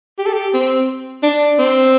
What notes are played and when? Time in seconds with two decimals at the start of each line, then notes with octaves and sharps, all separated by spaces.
0.19 G4
0.26 A4
0.33 G4
0.54 C4
1.23 D4
1.59 C4